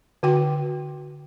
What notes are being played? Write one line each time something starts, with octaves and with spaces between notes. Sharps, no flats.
D3 F#4 G5